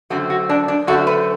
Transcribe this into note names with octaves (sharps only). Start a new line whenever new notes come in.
F#2 D3 A3 C4 F#4
F#4
D4
D4
F#2 D3 A3 C4 F#4
B4